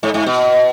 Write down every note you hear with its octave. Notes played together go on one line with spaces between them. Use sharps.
G#2
G#2
B2